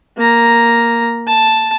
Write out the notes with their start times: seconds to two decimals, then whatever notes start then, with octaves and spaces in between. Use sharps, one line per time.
0.17 A#3 A#5
1.27 A5